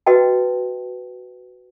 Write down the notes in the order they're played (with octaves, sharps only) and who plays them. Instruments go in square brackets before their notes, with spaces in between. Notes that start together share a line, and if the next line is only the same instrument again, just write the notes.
[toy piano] F#4 B4 D#5 G5 A5